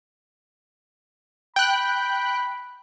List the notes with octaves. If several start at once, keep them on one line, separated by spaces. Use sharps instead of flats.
G5 B5 F#6